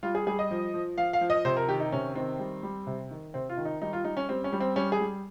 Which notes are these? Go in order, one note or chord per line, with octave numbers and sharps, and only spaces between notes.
G3 F4
G#4
G3 G#4
D#5
F3
F3
F3 F5
F5
F3
D#5
C3 C5
A#4
D#3 G4
D#4
C3 C#4
D#3 C4
G3
G3
C3
D#3
C3 C4
F4
D#3
D#4
G3 D#4
F4
G3 D#4
C#4
G3 C4
C#4
G3
C4
G3 C#4
G#4
G3